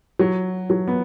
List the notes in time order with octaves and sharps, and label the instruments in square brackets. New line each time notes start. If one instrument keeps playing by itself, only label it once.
[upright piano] F#3
F#3
B3